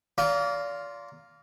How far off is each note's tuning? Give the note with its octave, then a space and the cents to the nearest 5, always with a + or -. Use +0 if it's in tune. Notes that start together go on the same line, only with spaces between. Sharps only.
F4 +0 D5 -35 A#5 +0